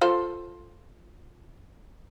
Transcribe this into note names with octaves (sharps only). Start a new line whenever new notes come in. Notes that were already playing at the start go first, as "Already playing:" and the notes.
F4 A4 C5